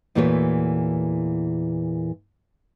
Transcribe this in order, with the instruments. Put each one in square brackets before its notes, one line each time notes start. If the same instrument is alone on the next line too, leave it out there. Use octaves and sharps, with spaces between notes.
[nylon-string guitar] E2 A#2 E3 A3 F#4 C#5